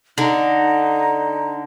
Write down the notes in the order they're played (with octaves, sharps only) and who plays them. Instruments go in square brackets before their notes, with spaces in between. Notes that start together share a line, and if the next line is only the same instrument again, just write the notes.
[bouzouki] D3 [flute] D#4